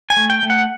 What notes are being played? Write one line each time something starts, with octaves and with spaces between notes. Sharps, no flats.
G#5
A3
G5
A3
F#5